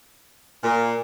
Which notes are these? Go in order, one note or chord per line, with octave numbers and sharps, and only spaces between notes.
A#2